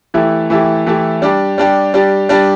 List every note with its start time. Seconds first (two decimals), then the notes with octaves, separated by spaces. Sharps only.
0.14 E3 A3 E4 G4
0.50 E3 A3 E4 G4
0.86 E3 A3 E4 G4
1.22 G3 D4 G4
1.58 G3 D4 G4
1.94 G3 D4 G4
2.29 G3 D4 G4